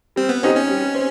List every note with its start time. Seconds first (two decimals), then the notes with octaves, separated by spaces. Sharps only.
0.16 G3 C4
0.29 B3
0.43 C4 C#4 D#4 G4
0.55 C#4
0.69 G3
0.94 C4